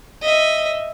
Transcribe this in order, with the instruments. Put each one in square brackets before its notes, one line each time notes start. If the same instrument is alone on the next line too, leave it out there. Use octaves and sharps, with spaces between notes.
[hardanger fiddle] D#5 E5